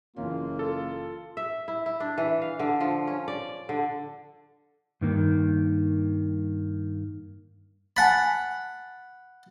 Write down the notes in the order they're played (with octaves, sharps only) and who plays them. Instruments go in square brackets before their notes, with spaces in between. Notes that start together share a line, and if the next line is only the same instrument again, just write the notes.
[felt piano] F#1 E3 C#4 [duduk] A#3 [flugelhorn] F4
[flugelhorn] F4 [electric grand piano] A4
[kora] E5
E4
E4
D4
E3
F5
D3
F3
C#4
D5
D3
[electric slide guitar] G2 D#3 A#3
[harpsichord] F#5 B5 [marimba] G#5 A5 A6